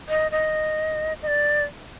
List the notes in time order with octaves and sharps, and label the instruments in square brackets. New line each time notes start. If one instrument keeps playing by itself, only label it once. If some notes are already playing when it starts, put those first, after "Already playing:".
[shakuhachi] D#5
D#5
D#5
D5